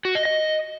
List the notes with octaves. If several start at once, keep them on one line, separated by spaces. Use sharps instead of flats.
F#4
D#5
D#5